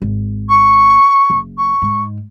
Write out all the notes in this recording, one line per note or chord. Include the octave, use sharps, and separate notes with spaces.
G#1
C#6
F#1
C#6
G#2